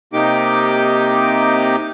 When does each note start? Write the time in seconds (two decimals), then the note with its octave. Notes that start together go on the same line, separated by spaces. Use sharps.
0.13 C3 A#3 D#4 G4 D6